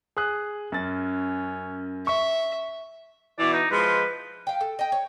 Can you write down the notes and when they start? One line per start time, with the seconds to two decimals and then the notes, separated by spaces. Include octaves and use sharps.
0.17 G#4 D#6 F#6
0.72 F#2 C#4 A6
2.07 E5 C#6
3.39 B2 E3 D5
3.53 D#4
3.71 F3 G#3 B4
4.47 F5 G5
4.61 A4
4.79 D#5 G5
4.92 C#5